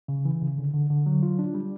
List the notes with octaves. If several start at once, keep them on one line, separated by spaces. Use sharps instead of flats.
C#3
E3
C#3
D3
D3
D3
F#3
F4
D4
G3